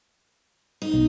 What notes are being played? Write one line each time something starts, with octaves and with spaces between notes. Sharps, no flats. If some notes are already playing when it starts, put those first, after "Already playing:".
D#4
B1